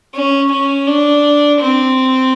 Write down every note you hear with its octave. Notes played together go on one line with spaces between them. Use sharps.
C#4
C#4
D4
C4